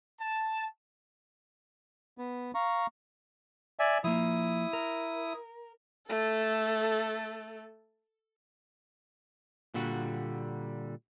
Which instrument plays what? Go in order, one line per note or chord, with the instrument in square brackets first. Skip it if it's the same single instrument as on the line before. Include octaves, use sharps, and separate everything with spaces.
[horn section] A5
[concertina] B3
F5 A#5 C#6
[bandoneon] D5 E5 G#5
[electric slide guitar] F3 A#3 [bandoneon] E4 D#6
[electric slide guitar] A#4
[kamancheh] A3 A4
[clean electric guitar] A#2 D3 G3 F#4